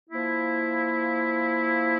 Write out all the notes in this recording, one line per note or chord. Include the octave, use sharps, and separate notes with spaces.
F3 A#3 E4